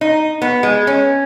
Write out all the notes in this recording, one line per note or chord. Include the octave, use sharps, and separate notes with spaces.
D#4
B3
G#3
C#4